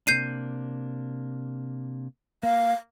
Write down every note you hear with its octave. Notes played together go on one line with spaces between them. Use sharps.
C3 A#3 D4 G6 C7 D#7
A#3 F5